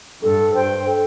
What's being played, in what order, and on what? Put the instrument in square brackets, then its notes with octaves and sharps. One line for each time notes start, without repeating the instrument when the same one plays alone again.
[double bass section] G2 [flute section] A4
[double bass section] G2 [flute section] C5 G5 C6
[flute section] A4